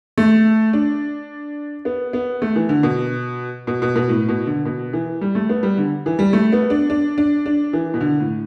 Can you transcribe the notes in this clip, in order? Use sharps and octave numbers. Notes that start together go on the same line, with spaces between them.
A3
D4
B3
B3
A3
E3
D3
B2
B2
B2
B2
A2
B2
D3
B2
E3
G3
A3
B3
G3
D3
E3
G3
A3
B3
D4
D4
D4
D4
E3
B2
D3
A2